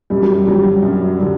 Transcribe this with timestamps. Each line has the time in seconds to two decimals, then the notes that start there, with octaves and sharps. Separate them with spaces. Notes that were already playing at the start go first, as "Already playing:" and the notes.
0.10 F#2 G3
0.23 F#3
0.46 D3 F#3 G3
0.82 F#2
1.18 D3 G3